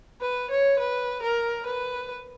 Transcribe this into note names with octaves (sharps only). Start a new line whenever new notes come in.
B4
C#5
B4
A#4
B4